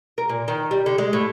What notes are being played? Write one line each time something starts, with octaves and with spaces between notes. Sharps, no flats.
A#4
A#2
D#3
G3
D3
G#3
A2